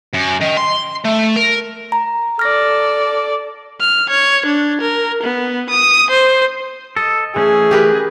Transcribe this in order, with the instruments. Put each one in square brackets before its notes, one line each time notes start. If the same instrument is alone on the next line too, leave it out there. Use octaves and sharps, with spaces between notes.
[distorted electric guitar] F#2
D#3
C6
A3
A#4
[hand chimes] A#5
[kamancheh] A4 D5 [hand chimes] F6 A#6
[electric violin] F6
C#5
D4
A#4
B3
D#6
C5
[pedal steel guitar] A4 [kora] D#5
[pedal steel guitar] E3 A3 C#4 [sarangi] G#4
[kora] G4 A#4 B4